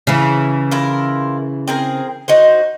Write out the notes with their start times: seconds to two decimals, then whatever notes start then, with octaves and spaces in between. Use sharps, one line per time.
0.07 C#3 E3
0.71 E4 F4 A#4
1.68 C4 G#4 A#4
2.28 D#4 F#4 C5